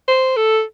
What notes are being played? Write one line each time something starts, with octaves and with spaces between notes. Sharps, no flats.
C5
A4